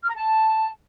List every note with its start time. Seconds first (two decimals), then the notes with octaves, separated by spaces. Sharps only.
0.03 F6
0.09 A#5
0.16 A5